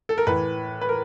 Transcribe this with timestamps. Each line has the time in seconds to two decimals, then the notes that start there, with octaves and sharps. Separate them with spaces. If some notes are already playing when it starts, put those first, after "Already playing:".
0.09 A4
0.18 A#4
0.27 A2 E3 B4
0.81 B4
0.89 A#4